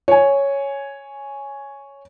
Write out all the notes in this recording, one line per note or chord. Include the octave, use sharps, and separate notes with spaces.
C#5 G#5